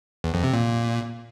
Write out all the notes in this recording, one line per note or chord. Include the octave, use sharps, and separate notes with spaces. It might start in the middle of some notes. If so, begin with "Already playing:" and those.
E2
F2
C3
A#2